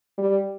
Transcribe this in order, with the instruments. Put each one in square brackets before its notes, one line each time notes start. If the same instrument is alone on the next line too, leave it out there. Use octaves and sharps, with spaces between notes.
[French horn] G3